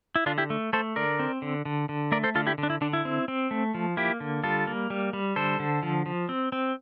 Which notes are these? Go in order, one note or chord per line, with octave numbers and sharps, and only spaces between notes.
E4
D3 D4 F4
E4 G4
A3
A3 A4 C5
D3 A#4 D5
C4
D3
D3
D3
A3 A#4 D5
A4 C5
D3 F4 A4
E4 G4
D3
D4
E4
D3 D4
E4
C4
C4
A3
F3
A#3 E4 G4
D3
G3 F4 A4
A#3
G3
G3
D3 A4 C5
D3
F3
F3
C4
C4